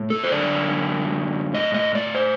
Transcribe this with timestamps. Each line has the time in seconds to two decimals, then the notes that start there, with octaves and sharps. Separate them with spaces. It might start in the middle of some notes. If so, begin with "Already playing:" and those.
Already playing: A2
0.10 A4
0.24 C5
0.31 F#2 D3 D5
1.54 A2 D#5
1.74 D#5
1.95 D5
2.15 C5